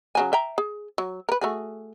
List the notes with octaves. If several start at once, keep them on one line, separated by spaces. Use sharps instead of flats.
C#3 F#3 G#5
E5 G5 A#5
G#4
F#3
A#4 B4
A3 F#4 G#4